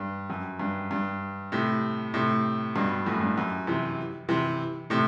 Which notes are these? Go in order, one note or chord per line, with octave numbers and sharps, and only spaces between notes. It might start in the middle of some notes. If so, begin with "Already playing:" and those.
Already playing: G2
F#2
G2
G2
A2 C3
A2 C3
G2 B2
F#2 A2
G2
F#2
C3 E3
C3 E3
A2 C3